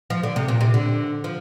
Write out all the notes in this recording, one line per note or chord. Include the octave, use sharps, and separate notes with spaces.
F3
D3
C3
A#2
C3
D3
F3